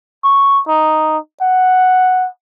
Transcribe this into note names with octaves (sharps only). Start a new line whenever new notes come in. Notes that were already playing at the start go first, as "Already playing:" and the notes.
C#6
D#4
F#5